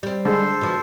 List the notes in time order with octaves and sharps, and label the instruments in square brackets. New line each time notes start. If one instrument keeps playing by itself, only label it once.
[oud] G3 C4
[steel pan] D3 G#3 D4 [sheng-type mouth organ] A4 C5
[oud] B2 F3